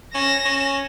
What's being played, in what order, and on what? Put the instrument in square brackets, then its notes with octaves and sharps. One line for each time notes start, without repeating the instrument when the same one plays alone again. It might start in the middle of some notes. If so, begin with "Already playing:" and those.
[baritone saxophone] C#4 [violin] A#6 E7
[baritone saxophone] C#4